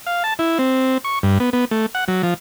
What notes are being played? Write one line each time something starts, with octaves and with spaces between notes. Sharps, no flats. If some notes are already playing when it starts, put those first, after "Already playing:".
F5
A5
E4
C4
C#6
G2
B3
B3
A3
F#5
F#3
F3